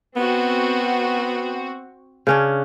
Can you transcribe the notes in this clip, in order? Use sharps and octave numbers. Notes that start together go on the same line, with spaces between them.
B3 C4 F#4
C#3 C#4 D4